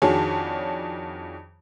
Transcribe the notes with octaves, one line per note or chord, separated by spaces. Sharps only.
F2 D#3 D4 F#4 G#4 C#5